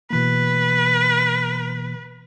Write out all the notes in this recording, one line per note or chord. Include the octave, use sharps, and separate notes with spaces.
B2 E3 A#3 B4